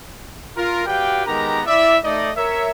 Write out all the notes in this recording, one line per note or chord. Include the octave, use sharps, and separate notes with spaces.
F4 A#4
F#4 G4 B4 D5 F5 G5
D#3 G#3 B3 G4 A#4 A#5
E4 D5 E5
A3 D#4 D5 D#5
A#4 C#5 E5